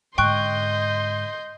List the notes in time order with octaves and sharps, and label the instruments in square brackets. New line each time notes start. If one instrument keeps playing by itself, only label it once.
[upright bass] G#2 D3 [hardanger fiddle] D#5 [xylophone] G5 C#6 F#6 [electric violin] C6 G6